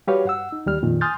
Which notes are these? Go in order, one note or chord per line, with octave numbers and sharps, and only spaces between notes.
G3 F#4 G4 B4 C#5 F5
G2 F#5 E6
D#4
D#2 G3 F6
F2 A#2 D#3
G#5 C6 D#6 F6 G6 A6